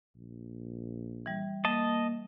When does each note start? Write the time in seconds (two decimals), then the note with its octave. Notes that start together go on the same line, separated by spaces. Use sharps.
0.15 A#1
1.26 E3 G3
1.65 A#3 D#5 A5